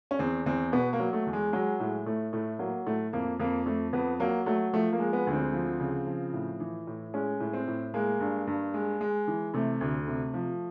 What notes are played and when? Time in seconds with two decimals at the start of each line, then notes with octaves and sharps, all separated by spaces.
0.11 C#4
0.19 E2 C4
0.46 E2 C4
0.72 B2 B3
0.93 A#3
1.00 F#3
1.13 A3
1.27 E2
1.33 G#3
1.53 F#3 G#3
1.79 A2 G#3
2.06 A2 A3
2.33 A2 A3
2.59 F#3 A#3
2.86 A2 A3
3.13 F2 A#3
3.40 F2 A#3
3.66 F2 A3
3.93 F2 B3
4.20 F#3 A#3
4.46 F#3 A3
4.73 F3 A3
4.93 A#3
4.99 G#3
5.13 B3
5.27 D2
5.33 C4
5.53 F3
5.80 C#3
6.07 F3
6.33 A2
6.60 E3
6.87 A2
7.14 G#3 C#4
7.40 A2
7.53 C4
7.68 A2
7.94 G#3 A#3
8.20 G2
8.47 G2
8.74 G#3
9.01 G#3
9.28 E3
9.54 C3 A3
9.81 D2
10.08 C3
10.34 F3